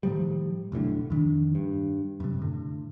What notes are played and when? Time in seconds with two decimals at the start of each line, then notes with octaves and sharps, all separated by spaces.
0.03 A2 D#3 F3 G3
0.72 F1 B1 A2 D3
1.10 F2 D#3 D4
1.55 G2
2.20 F#2 C3
2.42 A2 D3